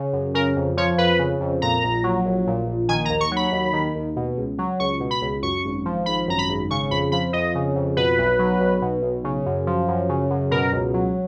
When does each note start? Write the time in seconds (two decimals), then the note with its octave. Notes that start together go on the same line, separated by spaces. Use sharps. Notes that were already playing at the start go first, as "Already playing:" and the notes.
Already playing: C#3
0.13 F#2
0.34 C#3 A#4
0.56 F2
0.77 F3 C#5
0.98 F2 B4
1.19 C#3
1.40 F2
1.62 A#2 A#5
1.84 A#1
2.04 F#3
2.25 A#1
2.47 A#2
2.67 A#1
2.89 D#3 G#5
3.05 A#5
3.10 D#2
3.21 C#6
3.31 F#3
3.36 B5
3.52 D#2
3.73 D#3
3.95 D#2
4.16 B2
4.37 C#2
4.58 F#3
4.80 C#2 C#6
5.00 B2
5.11 B5
5.22 C#2
5.42 F#2 C#6
5.65 G#1
5.85 F3
6.06 G#1 B5
6.27 F#2 A#5
6.39 B5
6.49 G#1
6.71 C#3 C#6
6.91 F2 B5
7.12 F3 B5
7.33 F2 D#5
7.55 C#3
7.76 F2
7.97 B2 B4
8.18 B1
8.39 F#3
8.60 B1
8.82 B2
9.02 B1
9.24 C#3
9.46 F#2
9.67 F3
9.88 F#2
10.09 C#3
10.30 F#2
10.51 B2 A#4
10.72 C#2
10.94 F#3